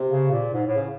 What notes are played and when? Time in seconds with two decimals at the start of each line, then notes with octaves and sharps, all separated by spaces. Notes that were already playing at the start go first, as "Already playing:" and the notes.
Already playing: C3
0.09 C#3
0.31 A#2
0.53 G#2
0.67 A2
0.76 C#3